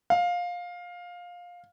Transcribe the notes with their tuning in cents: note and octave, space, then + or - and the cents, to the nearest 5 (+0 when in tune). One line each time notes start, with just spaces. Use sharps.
F5 +15